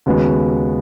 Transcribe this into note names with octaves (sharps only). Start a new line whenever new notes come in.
D#2 C#3 G#3 B3 F#4